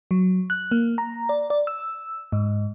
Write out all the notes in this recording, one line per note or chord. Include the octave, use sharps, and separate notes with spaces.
F#3
F#6
A#3
A#5
D5
D5
E6
G#2